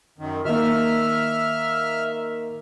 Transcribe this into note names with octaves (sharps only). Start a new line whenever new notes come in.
F#2 D#3
D#3 A#3 E5 F6